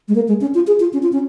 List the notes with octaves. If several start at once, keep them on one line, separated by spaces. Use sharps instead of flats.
G#3
A#3
G#3
C#4
F4
G#4
F4
C#4
F4
C#4